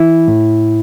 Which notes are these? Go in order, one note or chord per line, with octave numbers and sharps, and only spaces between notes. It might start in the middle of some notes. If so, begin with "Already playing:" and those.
Already playing: E3 E4
A2